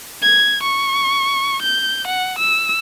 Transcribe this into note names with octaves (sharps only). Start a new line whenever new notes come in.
G#6
C#6
G6
F#5
E6